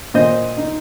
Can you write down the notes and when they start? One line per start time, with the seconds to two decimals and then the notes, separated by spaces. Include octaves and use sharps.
0.14 A#2 C5 D#5
0.57 D#4